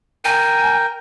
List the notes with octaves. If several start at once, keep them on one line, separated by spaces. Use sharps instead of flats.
A#4 G5 G#5